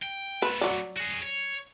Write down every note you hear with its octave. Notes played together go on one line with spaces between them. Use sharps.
G5
A3 B3 B4
F#3 D5
F#4 G#4
C#5